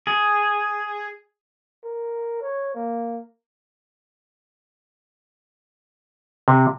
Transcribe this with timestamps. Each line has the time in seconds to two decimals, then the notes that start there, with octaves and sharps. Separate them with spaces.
0.07 G#4
1.84 A#4
2.42 C#5
2.75 A#3
6.48 C3